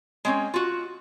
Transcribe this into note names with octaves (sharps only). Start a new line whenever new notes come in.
G#3 C4 C#4
F4 F#4